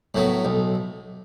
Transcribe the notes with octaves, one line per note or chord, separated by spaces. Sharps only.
A2 F#3 B3
B1